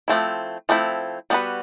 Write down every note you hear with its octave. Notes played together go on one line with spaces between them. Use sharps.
F3 A3 C4 E4
F3 A3 C4 E4
G3 B3 D4 F#4 B4